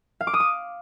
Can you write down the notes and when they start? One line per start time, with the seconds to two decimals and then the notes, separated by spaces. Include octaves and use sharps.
0.21 F5
0.27 D6
0.34 D#6
0.40 D6